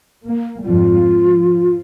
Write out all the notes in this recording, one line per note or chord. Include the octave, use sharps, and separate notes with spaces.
A#3
F2 G#2 G3 F4
F3